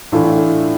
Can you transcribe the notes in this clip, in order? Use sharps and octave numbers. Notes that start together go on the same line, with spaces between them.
A2 E3 A3 D4 F4